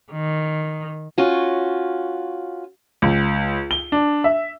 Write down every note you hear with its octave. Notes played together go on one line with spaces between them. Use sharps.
D#3
C#4 F4 F#4
C#2
G7
D4
E5